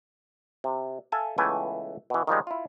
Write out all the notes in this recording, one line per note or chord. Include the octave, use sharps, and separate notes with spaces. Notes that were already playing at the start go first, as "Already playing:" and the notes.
C3
A4 E5 F5 G#5 A5
C#2 E3 A3 B3 G5 G#5
B2 E3
D#3 F3 G3 G#3
E4 F4